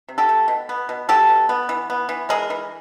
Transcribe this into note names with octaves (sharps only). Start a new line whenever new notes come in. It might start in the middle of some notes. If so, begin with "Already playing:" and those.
C3
G4 A4
A3
B2
B3
B2
F#3 G4 A4
B2
B3
E3
B3
E3
G#3 G#4 A#4
E3